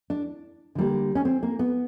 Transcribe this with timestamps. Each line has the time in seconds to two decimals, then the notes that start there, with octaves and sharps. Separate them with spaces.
0.10 D4
0.75 D3 G3 A#3
1.15 C#4
1.25 C4
1.43 A#3
1.59 B3